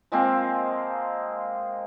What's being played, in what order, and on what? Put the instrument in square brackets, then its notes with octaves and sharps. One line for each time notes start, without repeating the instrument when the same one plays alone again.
[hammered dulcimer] F3 G#3 A#3 C4